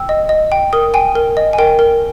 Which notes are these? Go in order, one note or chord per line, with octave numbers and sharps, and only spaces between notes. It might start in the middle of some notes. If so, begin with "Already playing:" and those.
Already playing: G5 E6
D#5
D#5
G5
A#4 D#6
G5 G#5
A#4
D#5
G#5
A#4 G5
A#4